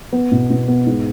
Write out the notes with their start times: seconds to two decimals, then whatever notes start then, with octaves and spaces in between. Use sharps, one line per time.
0.12 B3
0.31 B2
0.50 B2
0.68 B3
0.86 G#2